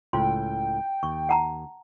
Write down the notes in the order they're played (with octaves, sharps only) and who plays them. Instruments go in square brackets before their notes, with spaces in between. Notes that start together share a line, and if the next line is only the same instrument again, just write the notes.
[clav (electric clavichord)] C#2 A2 [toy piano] F4 C6 [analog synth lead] G5
[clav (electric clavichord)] D#2 [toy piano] C#6
[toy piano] F#5 A5 A#5